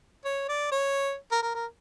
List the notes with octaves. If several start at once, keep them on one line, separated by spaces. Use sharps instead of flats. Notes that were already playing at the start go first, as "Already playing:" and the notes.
C#5
D5
C#5
A#4
A#4
A#4